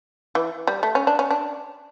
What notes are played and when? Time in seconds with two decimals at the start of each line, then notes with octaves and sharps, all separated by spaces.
0.35 E3
0.67 G3
0.83 A3
0.95 C#4
1.07 D4
1.19 C#4
1.31 D4